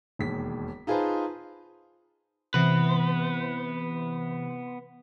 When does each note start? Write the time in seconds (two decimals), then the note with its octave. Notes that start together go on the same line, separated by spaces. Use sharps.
0.19 E1 D#2 B6
0.87 D#4 F4 G#4 B4 C5 A5
2.54 C3 E3 B3 B4